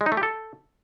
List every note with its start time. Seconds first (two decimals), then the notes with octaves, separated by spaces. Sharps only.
0.01 G#3
0.06 D#4
0.12 A3
0.17 G4
0.23 A4